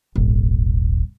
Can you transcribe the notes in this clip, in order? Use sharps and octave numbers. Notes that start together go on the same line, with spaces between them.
D#1 G#1